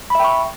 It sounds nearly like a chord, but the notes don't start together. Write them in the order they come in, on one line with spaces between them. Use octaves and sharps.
B5 E5 G5 C#6